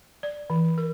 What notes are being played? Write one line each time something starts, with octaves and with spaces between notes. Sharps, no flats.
D5
E3
A#4